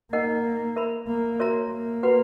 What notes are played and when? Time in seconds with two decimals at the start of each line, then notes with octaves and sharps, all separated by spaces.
0.13 A#3 D#4 A#4 D#5 F#5
0.76 A#4 E5 B5
1.07 A#3
1.39 F#4 A#4 C#5 E5 A#5
1.71 A#3
2.03 F#4 B4 F#5 B5